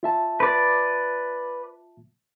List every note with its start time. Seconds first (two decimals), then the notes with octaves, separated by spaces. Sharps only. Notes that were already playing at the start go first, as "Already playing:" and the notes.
0.03 F4 E5 A5
0.40 B4 D5